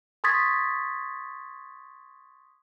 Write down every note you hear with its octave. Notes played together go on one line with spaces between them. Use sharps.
C6 C#6 D#6 G#6 A6 B6